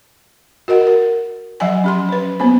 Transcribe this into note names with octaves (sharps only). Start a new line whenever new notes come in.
F#4 A#4 D#5 F#5
A#4
F3 F#3 E5 F#5 G#5
C#4 G4 C6
C#4 B4
A#3 B3 C#4 C5